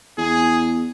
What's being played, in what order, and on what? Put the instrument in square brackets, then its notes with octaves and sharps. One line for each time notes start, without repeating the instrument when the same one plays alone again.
[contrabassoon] E2 [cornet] G#4